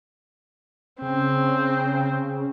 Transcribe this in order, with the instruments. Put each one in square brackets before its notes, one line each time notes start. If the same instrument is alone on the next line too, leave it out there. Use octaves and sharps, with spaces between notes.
[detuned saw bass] C#3 [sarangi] C4